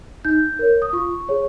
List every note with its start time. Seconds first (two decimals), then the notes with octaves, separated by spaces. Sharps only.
0.25 D#4 G6
0.59 A#4 C#5
0.82 D#6
0.93 F4 C#6
1.29 G#4 C#5